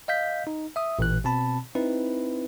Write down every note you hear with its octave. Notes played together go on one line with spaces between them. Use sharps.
D#5 F5 G6 B6
D#4
E5 D#6
A1 A#2 E3 F#6
B2 C4 A5 B5
C4 D#4 E4 B4